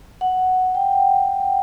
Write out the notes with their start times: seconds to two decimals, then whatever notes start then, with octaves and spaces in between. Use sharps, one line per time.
0.21 F#5
0.75 G5